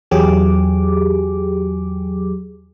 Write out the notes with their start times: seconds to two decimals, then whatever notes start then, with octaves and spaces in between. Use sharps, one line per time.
0.11 E2 F#3 G4 G#4 D6